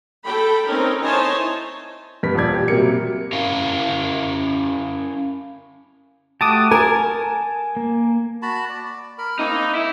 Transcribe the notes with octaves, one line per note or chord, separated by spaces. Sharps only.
A4 G5 B5
C4 C#4 D#4 A#4
D#4 E4 C5 C#5 G#5 A5
G2 B3 B6
D#1 F2 D5 G#6
G4
C3 F#3 G3 A#3 C#7
C#4 E4 A#4 F5
A3 F#4 G4 A5 D6 D#6
A#4 G#5 A5
A#3
F#4 A5 B5
D5
A#4 B5
A#3 C4 D#4 E4
E4